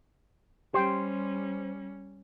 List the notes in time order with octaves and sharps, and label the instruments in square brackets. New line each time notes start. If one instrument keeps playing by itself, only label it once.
[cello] G3 C#4 [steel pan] G4 G5 [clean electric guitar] C5